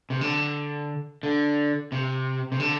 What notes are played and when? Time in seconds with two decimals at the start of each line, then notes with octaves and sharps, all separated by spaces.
0.10 C3
0.21 D3
1.23 D3
1.92 C3
2.52 C3
2.60 D3